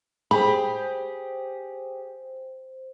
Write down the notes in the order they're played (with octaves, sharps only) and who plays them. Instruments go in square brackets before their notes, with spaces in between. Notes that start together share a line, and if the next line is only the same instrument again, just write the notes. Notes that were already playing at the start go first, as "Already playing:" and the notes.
[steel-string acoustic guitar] G4 G#4 [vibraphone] C5 [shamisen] B5